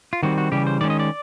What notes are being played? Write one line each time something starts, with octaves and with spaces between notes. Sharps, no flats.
F4
D#3 G3 C4 F#4
F#4
C#3 E3 G3 G4
C5
D#3 G#3 C#4 D5
D#5
D5